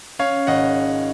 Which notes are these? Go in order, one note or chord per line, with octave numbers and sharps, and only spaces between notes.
C#4 C#5 F5
G#1 D#5 F#5